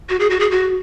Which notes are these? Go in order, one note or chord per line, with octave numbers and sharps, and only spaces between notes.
F#4
G#4
F#4
G#4
F#4